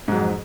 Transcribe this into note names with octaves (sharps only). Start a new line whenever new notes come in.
F2 G#2 F#3